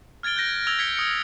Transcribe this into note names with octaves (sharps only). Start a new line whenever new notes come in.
F6 G#6 A6 D7 G7
F#6 G6 A#6 D7
E6 G#6 A6 F7 G7
G#6 B6 C#7 G7
D#6 C#7 D7